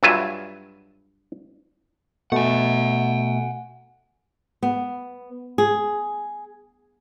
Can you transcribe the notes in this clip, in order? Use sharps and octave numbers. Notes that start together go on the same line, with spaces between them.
G2 F#3 F4 E5 G#5
B2 A3 F#5 G#5
B3
G#4